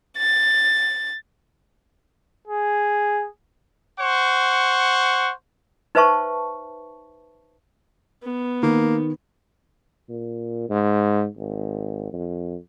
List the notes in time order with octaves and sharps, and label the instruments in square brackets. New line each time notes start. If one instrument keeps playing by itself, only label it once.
[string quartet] A6
[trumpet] G#4
[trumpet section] C5 F#5 C#6
[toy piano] D#4 B4 C5 E5 A5 C#6
[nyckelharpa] B3
[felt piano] D#3 [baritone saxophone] A#3
[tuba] A#2
G#2
G#1
F2